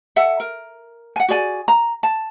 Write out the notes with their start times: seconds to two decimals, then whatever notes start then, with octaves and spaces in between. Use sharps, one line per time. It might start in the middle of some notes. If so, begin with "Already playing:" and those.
0.16 A4 E5 F#5
0.40 A#4
1.16 F#5 G#5
1.29 F#4 G#4 D5 G#5
1.68 A#5
2.03 A5